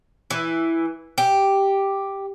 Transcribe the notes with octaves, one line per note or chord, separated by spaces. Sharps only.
E3
G4